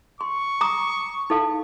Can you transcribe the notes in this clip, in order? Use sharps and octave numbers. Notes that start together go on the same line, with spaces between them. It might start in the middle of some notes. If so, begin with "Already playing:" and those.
C6 C#6
A#5 D6 D#6
D#4 A4 F5